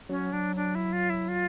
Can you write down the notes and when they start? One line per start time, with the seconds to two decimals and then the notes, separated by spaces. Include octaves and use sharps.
0.09 F#3 C#4
0.33 F#3 D4
0.56 D4
0.75 E4
0.93 F4
1.10 E4
1.28 F4